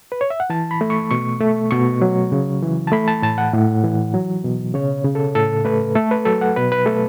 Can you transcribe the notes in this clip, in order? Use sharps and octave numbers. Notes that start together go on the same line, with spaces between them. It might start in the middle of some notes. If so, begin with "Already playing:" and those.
B4
C#5
E5
F#5
E3 A5
B5
A3
C#6
B2 C#6
A3
B2 C#6
F#3
C#3
E3
A5
A3 B5
A5
A2 A5
F#5
A2
E3
F#3
B2
C#3 C#5
C#3
A4
A2 A4
A3 B4
A3 A4
B4
F#3 A4
F#5
B2 B4
B4
A3 A4